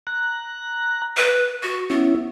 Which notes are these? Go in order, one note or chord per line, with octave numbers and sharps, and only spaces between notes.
A#5 F#6
B4
F#4 C#6
B3 C#4 E4